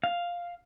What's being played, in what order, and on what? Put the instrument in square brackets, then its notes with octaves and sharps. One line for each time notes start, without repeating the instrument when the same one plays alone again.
[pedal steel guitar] F5